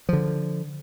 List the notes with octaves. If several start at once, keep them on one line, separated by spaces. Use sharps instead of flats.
D3 F3